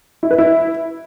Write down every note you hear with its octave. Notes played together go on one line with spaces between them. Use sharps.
E4
B4
E4